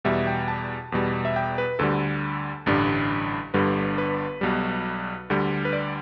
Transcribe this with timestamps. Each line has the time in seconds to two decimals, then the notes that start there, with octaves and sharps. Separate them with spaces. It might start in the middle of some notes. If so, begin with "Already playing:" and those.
0.04 E2 B2 G3 E5
0.27 G5
0.48 A5
0.92 E2 B2 G3
1.25 E5
1.36 G5
1.58 B4
1.79 D2 D3 G3 A4
2.66 A1 G2 D3 G3
3.54 G1 G2 D3 G3 B4
3.98 B4
4.41 B1 B2 G3
5.30 D2 D3 G3
5.65 B4
5.73 D5